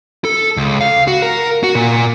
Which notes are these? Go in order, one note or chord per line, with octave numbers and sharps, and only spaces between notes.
A4
C#2
F5
F#4
A#4
F#4
A#2